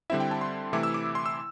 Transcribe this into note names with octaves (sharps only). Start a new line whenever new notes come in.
D3 G3 C4 E4 E5
G5
A5
C6
C3 E3 A3 E4 D6
E6
D6
C6
E6